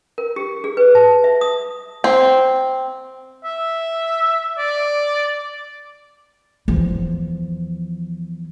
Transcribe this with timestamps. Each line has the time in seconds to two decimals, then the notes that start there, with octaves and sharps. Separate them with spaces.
0.18 A#4
0.36 G4
0.64 G#4
0.77 B4
0.95 A5
1.24 E5
1.41 D#6
2.04 C4
3.44 E5
4.58 D5
6.68 E2 F3